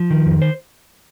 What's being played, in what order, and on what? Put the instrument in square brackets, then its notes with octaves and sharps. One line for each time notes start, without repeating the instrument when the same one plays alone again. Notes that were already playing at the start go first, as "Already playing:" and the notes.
Already playing: [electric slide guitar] F3
D#3
F2
C5